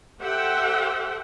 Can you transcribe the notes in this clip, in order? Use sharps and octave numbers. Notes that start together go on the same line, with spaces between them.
G4 A4 C5 E5 F#5 G5